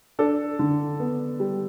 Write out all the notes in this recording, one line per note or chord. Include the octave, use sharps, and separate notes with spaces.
D4 A4
D3
B3
G3